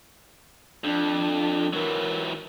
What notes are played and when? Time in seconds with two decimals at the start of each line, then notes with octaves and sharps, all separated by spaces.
0.84 F2 D4
1.73 E3 F#3 A#4